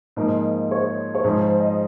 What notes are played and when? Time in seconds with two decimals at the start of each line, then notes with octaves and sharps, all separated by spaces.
0.16 G#2 F3 A#3 D#4 D#5
0.71 C#5
1.15 C#5
1.24 G#2 F3 G#3 C5
1.42 C5
1.60 D#5